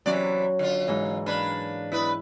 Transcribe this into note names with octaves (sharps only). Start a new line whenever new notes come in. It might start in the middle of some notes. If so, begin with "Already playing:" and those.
C3 E3 F#3 C#4 D5
D3 F4
G#2 E3
A#3 D4 B4
B3 E4 B4